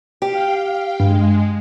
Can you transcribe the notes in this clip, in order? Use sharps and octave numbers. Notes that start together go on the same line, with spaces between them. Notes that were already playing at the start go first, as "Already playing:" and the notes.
G4 F5 G5
G2 G#3